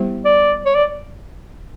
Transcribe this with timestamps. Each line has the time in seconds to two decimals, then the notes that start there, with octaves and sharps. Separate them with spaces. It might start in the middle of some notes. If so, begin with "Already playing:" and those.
Already playing: G3 B3 E4 G4 C5
0.25 D5
0.65 C#5
0.75 D5